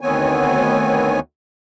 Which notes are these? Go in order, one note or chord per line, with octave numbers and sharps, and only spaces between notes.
D2 D#3 B3 C4 C#5 G#5